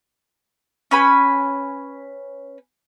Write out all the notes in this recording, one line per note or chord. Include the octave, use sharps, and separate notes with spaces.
C#4 B4 G#5 B5